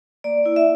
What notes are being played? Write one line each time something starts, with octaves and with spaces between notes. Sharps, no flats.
A#3 D5
E4
E5